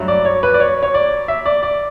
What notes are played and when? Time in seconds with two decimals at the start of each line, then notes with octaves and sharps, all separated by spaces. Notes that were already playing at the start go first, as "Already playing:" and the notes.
Already playing: G2 F#3 A3
0.08 D5
0.25 C#5
0.43 B4
0.54 D5
0.60 C#5
0.83 C#5
0.94 D5
1.28 E5
1.46 D5
1.63 D5